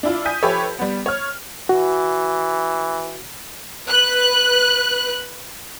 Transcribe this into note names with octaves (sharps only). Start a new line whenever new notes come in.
D4 E4 F4
G#5 D#6 G6 B6
F3 G4 A4 B4 C#5 E5
G3 B3
C#5 F6
E3 F#4
B4 F#6